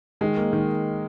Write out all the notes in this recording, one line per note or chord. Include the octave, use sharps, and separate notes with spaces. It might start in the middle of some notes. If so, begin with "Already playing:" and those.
D#3 G#3
A#3
D#3